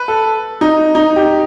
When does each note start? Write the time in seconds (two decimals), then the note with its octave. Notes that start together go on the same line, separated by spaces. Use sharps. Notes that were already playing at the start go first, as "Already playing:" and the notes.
Already playing: B4
0.08 A4
0.61 D#4
0.95 D#4
1.16 G4